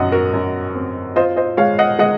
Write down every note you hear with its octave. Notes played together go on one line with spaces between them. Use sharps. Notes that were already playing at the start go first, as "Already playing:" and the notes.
Already playing: F#2 D#5 F#5
F#4 A#4
F#2
C4
F4 C5 D#5
C5 D#5
G#3 C#5 F5
D#5 F#5
G#3 D#5 F#5